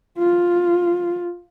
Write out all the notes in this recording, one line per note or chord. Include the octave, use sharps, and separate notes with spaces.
F4